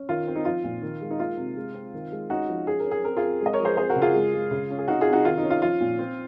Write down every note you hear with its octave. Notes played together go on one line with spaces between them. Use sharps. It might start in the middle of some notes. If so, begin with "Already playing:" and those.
Already playing: C#4
D#3 F4
C4
D#4
F3 F4
A#2
D#3
G#3
D#4
A#3 F4
C3
G#3
C4
D#3
G#3
C#4 D#4 F#4
F3
C#4 G#4
A#4
C#4
G#4
C4 A#4
F4 G#4
C4
G#3
D#5
A#4 C#5
F3
G#4 C5
C4 G#4 C5
F#4 A#4
C#3
F4 G#4
G#3
G#3
C#3
C#4
G#4
C3 D#4 F#4
F4 G#4
C3
D#4 F#4
D#3 F4
D#4
C#4
F4
F3 F4
A#2
C4